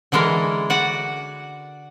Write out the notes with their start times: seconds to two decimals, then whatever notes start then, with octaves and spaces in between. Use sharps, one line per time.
0.12 D3 E3 G#3 A4 A#4
0.70 F#4 D5 F#5